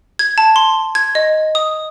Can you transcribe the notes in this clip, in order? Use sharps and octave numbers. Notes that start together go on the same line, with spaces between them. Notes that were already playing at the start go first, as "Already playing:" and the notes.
G#6
A5
C6
G#6
D#5
D#6